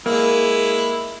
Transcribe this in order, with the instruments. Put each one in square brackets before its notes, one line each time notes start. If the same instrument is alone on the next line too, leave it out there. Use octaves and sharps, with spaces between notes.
[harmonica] G#3 E4 [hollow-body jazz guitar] A#3